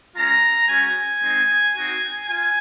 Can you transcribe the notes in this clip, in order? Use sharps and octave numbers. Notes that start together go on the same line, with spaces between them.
G#3 C#4 F4 A#5
G#3 C#4 F#4 G#5
G#3 C4 D#4
C4 D#4 F#4
F4 G#5